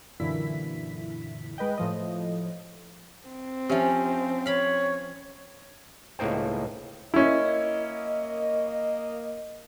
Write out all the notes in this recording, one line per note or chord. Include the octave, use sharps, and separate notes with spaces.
F#2 A#2 D3 E3 E4 B6
G#3 B4 D#5 G5
A2 F3 D#5
C4
F3 C#4 G4 E5
C#5 F5 B5
C#2 A2 A#3 D#4 C5 G5
A#3 C#4 E4 D#5